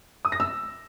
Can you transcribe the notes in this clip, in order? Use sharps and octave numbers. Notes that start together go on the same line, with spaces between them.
D#6
A#6
E6